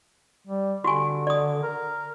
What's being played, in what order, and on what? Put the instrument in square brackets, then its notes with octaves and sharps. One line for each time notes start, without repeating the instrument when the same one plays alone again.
[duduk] G3
[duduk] D3 [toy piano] F#4 G4 G#5
[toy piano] D5 D#6
[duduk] A#4